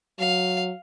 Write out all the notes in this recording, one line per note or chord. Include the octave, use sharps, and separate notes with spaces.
F#3 F5